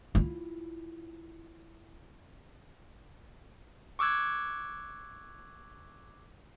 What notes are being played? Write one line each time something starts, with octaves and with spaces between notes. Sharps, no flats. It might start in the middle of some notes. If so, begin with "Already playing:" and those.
E4 F4
C#6 D6 E6 F#6 G#6